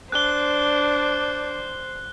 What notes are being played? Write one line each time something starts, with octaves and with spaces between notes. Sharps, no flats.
D4 C5 F#6 G7